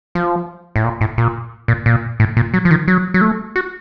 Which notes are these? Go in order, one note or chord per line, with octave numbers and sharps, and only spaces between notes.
F3
A2
A#2
A2
A#2
A#2
A#2
A2
A#2
F#3
F3
D#3
F#3
F#3
A3
F#4